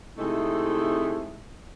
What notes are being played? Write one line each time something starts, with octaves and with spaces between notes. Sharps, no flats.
C3 G#3 A3 C4 D#4 E4